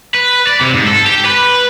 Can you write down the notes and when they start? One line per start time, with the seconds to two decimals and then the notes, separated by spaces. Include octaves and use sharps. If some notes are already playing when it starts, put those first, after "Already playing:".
0.15 B4
0.47 D5
0.61 C3
0.74 G#2
0.87 A4
1.06 G4
1.26 B4